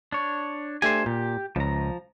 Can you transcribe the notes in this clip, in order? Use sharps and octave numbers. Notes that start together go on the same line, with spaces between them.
D4 C#5
A3 D4 G4 C5 G#5
A#2 G4
C#2 F3 A#5